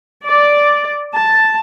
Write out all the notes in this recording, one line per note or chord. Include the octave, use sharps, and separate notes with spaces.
D5
A5